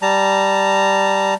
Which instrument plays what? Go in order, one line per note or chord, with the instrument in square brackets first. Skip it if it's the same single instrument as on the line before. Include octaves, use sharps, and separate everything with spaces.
[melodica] G3 A5 A#5